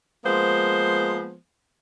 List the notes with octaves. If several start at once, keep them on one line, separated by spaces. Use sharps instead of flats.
F3 G#3 A#3 B3 C5